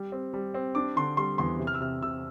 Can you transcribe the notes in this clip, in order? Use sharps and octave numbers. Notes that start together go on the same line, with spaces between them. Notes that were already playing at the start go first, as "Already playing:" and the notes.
Already playing: G3
C4
G3
C4
D4 D6
D3 C6
G3 C6
E2 C6
C3
F6
E6
C3 F6
C3 E6